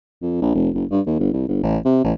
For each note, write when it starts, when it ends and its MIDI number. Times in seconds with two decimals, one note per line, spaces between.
0.22 0.39 41
0.42 0.50 34
0.55 0.69 29
0.74 0.84 30
0.91 1.00 43
1.06 1.16 39
1.19 1.29 31
1.33 1.47 36
1.48 1.59 31
1.62 1.77 33
1.85 2.01 48
2.04 2.12 33